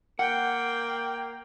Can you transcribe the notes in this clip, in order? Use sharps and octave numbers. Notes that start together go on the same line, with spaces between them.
A#3 F#5 G5